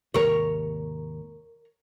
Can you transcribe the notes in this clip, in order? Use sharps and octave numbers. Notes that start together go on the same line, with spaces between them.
D#2 G#2 C3 A#4 C#5